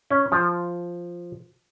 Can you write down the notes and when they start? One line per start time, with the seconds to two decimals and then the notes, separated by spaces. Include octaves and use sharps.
0.11 C#4
0.32 F3